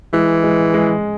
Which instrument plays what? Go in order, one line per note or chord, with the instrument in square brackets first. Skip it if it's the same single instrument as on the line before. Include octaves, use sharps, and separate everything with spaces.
[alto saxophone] E3 [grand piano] G#3
[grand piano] G#3
G#3